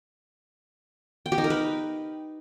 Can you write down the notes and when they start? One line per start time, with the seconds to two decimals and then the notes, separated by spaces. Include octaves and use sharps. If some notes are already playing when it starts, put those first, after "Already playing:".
1.26 G5
1.32 G4
1.38 D#4
1.44 A#4
1.50 B4